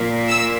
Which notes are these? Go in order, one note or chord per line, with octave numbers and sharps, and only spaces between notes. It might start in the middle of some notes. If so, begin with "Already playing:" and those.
Already playing: A#2
E6